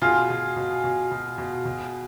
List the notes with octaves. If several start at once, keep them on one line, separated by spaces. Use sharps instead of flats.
B2 F4 G#4
B2
B2
B2
B2
B2
B2